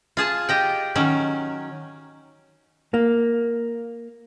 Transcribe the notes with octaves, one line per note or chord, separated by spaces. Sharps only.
F4 G#4 A5
G4 D#5 G5
D#3 F#3 C#4
A#3